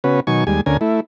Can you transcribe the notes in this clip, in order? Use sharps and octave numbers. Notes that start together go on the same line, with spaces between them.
C#3 B3 C#4 F#4 B4
B2 D#3 F#3 G#5 C#6
D#2 G3 G#3 G#5
D2 D3 C#4 A#4 G#5
A3 E4